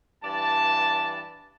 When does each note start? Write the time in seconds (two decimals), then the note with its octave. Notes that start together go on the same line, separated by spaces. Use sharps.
0.23 G2 E3 D5 A5